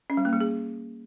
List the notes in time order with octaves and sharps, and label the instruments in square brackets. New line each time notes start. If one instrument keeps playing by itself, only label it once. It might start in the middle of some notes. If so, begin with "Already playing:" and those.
[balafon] C#4
G3
A#3
G3
G#4